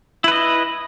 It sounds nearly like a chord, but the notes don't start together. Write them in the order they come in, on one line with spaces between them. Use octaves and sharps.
E4 B4 D#5